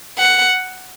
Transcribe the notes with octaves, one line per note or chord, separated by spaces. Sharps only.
F#5